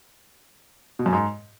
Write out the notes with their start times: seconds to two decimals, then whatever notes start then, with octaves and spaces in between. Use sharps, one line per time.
0.99 B2
1.06 F#2
1.13 G#2